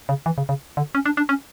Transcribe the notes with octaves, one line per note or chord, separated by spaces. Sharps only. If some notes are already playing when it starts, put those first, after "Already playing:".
C#3
E3
C#3
C#3
D3
C#4
D4
D4
C#4